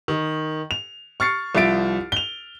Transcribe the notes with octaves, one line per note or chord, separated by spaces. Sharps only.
D#3
F7
C#6 F6 A6 C7 C#7
C2 F3 F4 E5 A6 D7
F7 G7